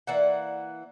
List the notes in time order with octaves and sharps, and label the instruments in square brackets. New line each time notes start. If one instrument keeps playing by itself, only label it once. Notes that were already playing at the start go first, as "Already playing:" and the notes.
[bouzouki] E3 A#3 D5 F#5